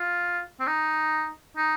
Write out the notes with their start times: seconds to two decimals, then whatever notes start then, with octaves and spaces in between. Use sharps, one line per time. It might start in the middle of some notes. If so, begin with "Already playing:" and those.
Already playing: F4
0.60 C4
0.67 D#4
1.57 D#4